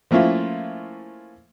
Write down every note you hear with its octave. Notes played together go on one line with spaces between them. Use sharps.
F3 A3 A#3 C#4 E4 F4